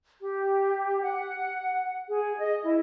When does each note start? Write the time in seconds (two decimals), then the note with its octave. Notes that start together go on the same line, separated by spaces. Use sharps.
0.21 G4
1.02 F#5
2.09 G#4
2.38 D#5
2.63 E4